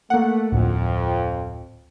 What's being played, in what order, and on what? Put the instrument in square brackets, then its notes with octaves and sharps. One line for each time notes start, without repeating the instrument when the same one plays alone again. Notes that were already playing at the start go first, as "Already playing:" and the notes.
[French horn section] A3 [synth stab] A#3 F#5
[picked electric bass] D1 [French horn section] F2